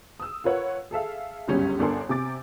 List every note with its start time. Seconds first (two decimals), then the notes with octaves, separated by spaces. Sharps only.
0.20 D#6 E6
0.44 F4 A#4 B4 C#5 F#5
0.91 G#4 A4 E5 F5
1.48 G1 C#2 F#2 G3 C#4
1.79 G1 D4 A4 A#4 G#5 C6
2.09 C3 G#5 D6 A6